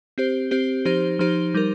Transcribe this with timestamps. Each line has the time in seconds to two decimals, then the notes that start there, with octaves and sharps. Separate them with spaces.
0.18 C4 G4 C5
0.51 C4 G4 C5
0.85 F3 D#4 G4 C5
1.19 F3 D#4 G4 C5
1.54 G3 D#4 A#4